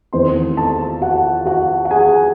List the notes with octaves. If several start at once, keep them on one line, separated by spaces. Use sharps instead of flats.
E2 D#3 A3 C4 C5 C6
A4 A5
F#4 F#5
F#4 F#5
F#5
G#4 G#5